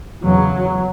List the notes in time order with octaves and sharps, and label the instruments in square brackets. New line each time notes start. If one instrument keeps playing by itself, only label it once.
[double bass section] E2 C#3 F#3